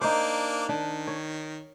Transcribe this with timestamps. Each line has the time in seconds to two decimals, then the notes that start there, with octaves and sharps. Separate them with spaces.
0.01 A#3 D4 D#4 C5 D6
0.69 D#3 D4
1.07 C#5